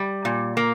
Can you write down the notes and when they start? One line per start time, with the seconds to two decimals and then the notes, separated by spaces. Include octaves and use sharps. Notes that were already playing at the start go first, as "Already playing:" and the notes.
Already playing: G3
0.25 A#2
0.57 A#3